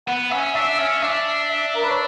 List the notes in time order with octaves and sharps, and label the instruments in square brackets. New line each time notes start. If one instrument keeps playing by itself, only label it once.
[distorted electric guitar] B3 [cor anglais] F#5
[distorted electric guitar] C#4 [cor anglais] E5
[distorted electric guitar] D4 [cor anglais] E5
[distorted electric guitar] C#4 [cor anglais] E5
[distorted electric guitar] D4 [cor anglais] E5
[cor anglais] E5
A#4
B4
C#5